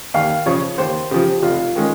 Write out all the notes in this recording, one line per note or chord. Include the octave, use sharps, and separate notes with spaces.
D#2 F5
C#3 F3 C#5
D#2 C5
C#3 F3 G4
F1 F4
D#3 G#3 C#4